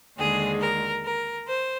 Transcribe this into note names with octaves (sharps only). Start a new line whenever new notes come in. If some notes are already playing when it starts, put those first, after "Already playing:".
D#2 D3 G#3 G#4
A#4
A#4
C5